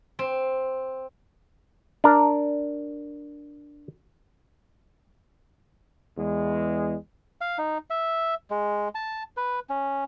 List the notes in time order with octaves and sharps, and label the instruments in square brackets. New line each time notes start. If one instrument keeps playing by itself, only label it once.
[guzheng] C4
[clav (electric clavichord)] D4 A#4
[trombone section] E2 G#3
[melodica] F5
D#4
E5
G#3
A5
B4
C#4